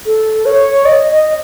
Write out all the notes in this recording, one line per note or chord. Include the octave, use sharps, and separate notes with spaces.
A4
C#5
D#5
D#5